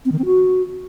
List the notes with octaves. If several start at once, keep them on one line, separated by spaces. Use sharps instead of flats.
C4
D#3
C4
F#4